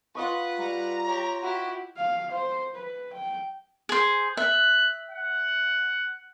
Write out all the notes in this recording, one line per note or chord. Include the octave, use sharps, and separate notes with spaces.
F4 B4 D#5 F#5 C#6
G3 A#5
G4 C#5
E4 F#4 G4
F5
C5
B4
G5
G#4 C5
E5 F#6
F#5